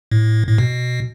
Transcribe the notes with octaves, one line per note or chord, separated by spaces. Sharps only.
A2
A2
B2